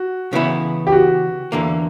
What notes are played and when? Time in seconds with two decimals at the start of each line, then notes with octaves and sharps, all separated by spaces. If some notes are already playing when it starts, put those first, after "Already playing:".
Already playing: F#4
0.33 C#3 E3 B3 E4
0.87 G4
0.92 F#4
1.52 E2 D3 A#3